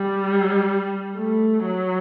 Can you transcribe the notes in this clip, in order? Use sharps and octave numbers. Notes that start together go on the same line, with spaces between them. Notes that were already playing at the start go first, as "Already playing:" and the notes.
Already playing: G3
A3
F#3